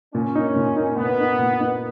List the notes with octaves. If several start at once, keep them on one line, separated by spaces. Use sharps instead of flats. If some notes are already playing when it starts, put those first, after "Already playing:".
A#2 C#4
A#3 D#4
A#2
A#3 D#4
A#2 B3
A#3 D#4
A#2
A#3 D#4